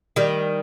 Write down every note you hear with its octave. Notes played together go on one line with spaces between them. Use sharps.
D#3 G3